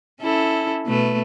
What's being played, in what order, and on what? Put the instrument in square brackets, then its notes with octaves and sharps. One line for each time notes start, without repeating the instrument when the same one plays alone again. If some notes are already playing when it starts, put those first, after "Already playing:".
[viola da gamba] C#4 E4 A4
B2 A3 B4